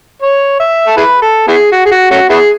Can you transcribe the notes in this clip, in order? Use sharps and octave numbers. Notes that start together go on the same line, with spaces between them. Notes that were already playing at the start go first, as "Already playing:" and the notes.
C#5
E5
A4
E4 G#4 B4
A4
B3 E4 G#4
F#4
G#4
F#4
A3 C#4 F#4
B3 E4 G#4